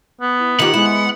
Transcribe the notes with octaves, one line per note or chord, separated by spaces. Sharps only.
B3
E4
D#3 F4 G4 F#5
G#3 B3 E4